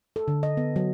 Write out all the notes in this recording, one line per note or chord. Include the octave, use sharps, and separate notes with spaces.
A4
D3
D#5
B3
F#3